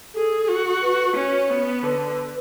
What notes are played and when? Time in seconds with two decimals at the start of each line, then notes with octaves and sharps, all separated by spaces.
0.15 G#4 A4
0.48 F#4
0.82 B4
1.16 C#4 C#5
1.50 B3
1.83 D3 B4